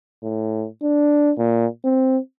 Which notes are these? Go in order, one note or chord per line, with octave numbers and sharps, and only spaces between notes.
A2
D4
A#2
C4